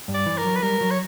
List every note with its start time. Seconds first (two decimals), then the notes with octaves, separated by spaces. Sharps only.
0.08 G2
0.14 D5
0.26 E3
0.38 A#4
0.45 F#3
0.55 B4
0.62 G3 A#4
0.81 F#3
0.91 C#5